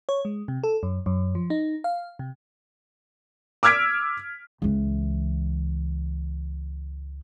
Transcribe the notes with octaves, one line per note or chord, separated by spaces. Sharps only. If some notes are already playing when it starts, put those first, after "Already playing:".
C#5
G#3
C3
A4
F#2
F#2
F3
D#4
F5
C3
D6 E6 F6 G#6 B6 D7
C#2 E3